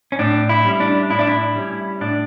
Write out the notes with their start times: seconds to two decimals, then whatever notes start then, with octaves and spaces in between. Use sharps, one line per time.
0.12 C#4
0.19 A2 D4
0.49 E4
0.65 G3 C#4
0.80 D4
1.10 A2 E4
1.19 D4
1.27 E4
1.55 G3 C#4
2.01 A2 D4